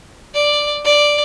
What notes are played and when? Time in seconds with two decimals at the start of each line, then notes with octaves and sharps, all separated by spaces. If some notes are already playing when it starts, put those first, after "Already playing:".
0.34 D5
0.85 D5